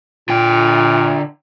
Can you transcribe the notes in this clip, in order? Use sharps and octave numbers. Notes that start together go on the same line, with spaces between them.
A#2 D3 G5